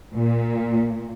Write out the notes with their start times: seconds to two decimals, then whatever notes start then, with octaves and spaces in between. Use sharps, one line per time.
0.16 A#2